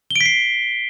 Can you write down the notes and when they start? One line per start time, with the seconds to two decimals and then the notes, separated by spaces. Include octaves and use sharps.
0.11 G7
0.16 D7
0.21 B6
0.26 C7